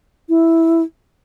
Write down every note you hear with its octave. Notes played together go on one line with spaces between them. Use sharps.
E4